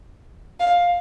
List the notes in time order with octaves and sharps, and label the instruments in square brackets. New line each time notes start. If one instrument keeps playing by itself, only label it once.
[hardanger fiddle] F5